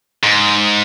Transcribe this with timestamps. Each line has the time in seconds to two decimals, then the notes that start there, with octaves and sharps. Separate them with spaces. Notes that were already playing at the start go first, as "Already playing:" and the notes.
0.24 G#2